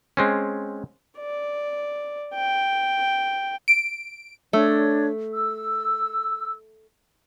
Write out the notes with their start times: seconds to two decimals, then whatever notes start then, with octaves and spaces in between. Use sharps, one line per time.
0.17 G#3 C4 C#4
1.19 D5
2.35 G5
3.68 D7
4.53 A3 D4 C#5
5.33 E6